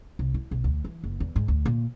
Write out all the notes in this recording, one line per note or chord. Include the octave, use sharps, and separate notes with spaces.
C2
E4
B1
D2
E3
F#1
E2
G#2
D2
A#2